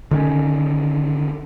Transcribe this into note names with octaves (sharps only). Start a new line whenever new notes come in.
D3 D#3 B3 C#4